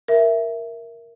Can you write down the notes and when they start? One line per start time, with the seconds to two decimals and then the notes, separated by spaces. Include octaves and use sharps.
0.08 A#4 E5